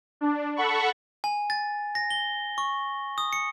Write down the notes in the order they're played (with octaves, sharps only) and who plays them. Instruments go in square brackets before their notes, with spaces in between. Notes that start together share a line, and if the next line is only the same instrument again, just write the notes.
[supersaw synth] D4
A4 F#5 B5 C#6
[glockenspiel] G#5
A6
A#6
G7
C#6
D#6
C#7